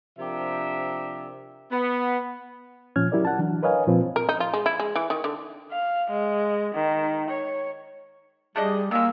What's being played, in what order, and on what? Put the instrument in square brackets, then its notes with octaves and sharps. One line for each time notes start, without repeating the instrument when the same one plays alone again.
[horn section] C3 F3 D4 G4 A#4 E5
B3
[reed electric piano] A#2 F3 C#4 F6 G#6
F#3 E4 G4 A#4 D5
F#5 A5
E3 F#3 D4
A#4 B4 C#5 D#5 F5 G#5
A#2 F3 C4 B4
[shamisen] A#4
D#4
F4
G#3
E4
G#3
E3
D#3
D3
[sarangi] F5
G#3
D#3
C#5
[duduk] G3 [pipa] A3 D4 D#5 [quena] G#4
[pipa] D#3 G#3 [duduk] A#3 [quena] E6